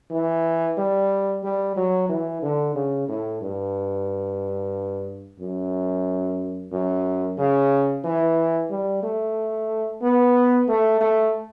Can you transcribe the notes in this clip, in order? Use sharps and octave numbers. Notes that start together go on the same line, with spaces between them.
E3
G3
G3
F#3
E3
D3
C#3
A2
G2
F#2
F#2
C#3
E3
G3
A3
B3
A3
A3